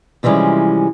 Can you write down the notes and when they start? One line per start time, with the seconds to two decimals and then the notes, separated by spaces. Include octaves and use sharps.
0.23 C3 E3 F3 G3 G#3 C#4